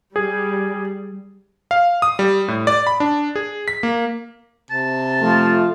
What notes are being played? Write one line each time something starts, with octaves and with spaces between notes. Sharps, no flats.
G3 G#4
F5
D#6
G3
A2
D5
B5
D4
G#4
B6
A#3
C3 A5
F3 A3 F4